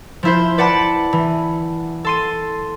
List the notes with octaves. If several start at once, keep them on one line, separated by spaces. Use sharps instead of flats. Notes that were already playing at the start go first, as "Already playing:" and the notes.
F3 E4 C5
B4 D5 F#5 A5 B5
E3
A4 C6 D#7